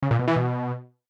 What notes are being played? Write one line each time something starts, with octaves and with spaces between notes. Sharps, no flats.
C#3
A#2
B2
E3
B2